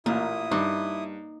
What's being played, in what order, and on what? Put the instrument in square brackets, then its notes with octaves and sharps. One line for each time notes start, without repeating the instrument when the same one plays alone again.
[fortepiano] A1 A#2 [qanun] A#3 [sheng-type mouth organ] E4 D#6
[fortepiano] G2 [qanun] D#4